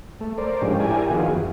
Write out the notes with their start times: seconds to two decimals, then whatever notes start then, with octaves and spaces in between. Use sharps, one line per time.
0.21 A3
0.38 A#4 C5 D5
0.62 A2 F3 G#3 C#4 D4 G4
0.80 E4 G4 A#4 D5 G#5
1.11 D#3 F3 B3 F4 F#4 G#4
1.34 F#2 E3